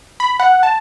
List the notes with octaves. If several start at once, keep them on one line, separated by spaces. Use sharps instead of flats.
B5
F#5
A5